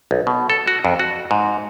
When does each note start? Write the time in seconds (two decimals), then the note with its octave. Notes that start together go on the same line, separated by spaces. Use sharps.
0.11 B1
0.27 B2
0.50 A4
0.68 F#4
0.85 F2
0.99 F#4
1.31 G#2